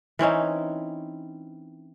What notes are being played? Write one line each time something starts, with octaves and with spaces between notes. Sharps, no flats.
E3 C4 C#4 D#4